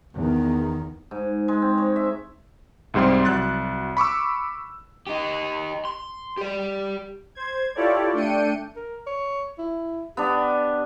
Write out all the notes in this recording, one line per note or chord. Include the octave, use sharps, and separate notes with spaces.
E2 D#3
G#2
G#3
C4
C#5
E5
C2 G#2 G3 C4 C6
C2 F#3 F#6 A6
B5 C#6 D6 E6
D#4 G4
C6
G4 D5
C5 G#6
E4 F4 G4 A4 C#5 D5
A3 D4 G5 C#7 D#7
A#4
C#5
E4
B3 D4 G4